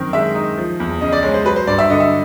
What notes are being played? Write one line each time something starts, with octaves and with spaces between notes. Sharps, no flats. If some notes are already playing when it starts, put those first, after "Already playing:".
Already playing: F#2 D#3 C4
G#3 E5
D#4
F3
E2
C#3 D#5
D5
G#3 C#5
C5
F#3 B4
C5
G2 D5
E5
D3 D#5
E5